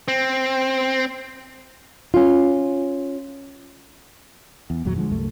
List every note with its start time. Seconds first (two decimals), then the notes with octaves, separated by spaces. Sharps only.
0.08 C4
2.14 C#4 F4
4.70 E2
4.85 G1 E2 A#2 F#3
4.96 D3 F3 F#3 G#3
5.11 C2 F#2 A3